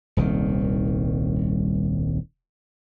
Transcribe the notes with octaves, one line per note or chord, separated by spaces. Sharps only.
D#1 C2 D#3